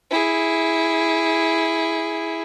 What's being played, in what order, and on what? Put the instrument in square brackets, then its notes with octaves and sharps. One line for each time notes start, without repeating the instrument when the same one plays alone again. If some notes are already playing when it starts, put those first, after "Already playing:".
[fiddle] E4 G#4